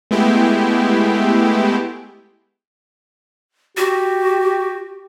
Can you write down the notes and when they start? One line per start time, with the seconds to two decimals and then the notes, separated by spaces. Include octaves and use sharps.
0.11 G#3 A3 B3 E4 G4
3.77 F#4 G4